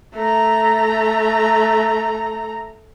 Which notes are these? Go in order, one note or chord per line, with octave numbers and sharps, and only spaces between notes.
A3 A#5